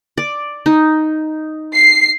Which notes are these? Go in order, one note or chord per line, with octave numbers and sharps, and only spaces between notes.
D5
D#4
C7